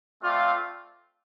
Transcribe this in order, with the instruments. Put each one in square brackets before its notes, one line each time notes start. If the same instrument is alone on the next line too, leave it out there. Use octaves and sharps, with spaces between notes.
[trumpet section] A3 C4 F4 D5 F5